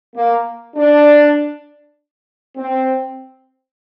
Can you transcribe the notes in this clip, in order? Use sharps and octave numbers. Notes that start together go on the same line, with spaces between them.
A#3
D4
C4